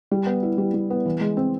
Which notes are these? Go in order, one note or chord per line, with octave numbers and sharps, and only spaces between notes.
G3
B3
E4
G3
G3
B3
E3
G#3
C4